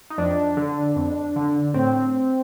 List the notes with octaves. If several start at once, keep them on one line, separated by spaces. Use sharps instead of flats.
D#4
F2 D4
D3
F2
D3
A2 C4